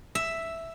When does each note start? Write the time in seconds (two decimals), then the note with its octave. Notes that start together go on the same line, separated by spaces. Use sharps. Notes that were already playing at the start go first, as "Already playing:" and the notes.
0.15 E5